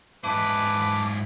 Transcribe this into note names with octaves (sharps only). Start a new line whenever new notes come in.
G#2 E4 B4 A5 D6